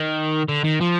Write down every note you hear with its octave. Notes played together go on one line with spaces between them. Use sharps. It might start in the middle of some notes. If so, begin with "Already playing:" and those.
Already playing: D#3
D3
D#3
F3